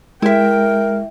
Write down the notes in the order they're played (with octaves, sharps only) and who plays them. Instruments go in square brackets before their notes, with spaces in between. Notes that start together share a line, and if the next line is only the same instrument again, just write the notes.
[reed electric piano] G#3 [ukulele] E4 E5 [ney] A#4 [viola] G5